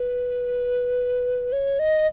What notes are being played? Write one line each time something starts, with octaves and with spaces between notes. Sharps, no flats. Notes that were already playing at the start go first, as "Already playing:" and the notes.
Already playing: B4
C#5
D#5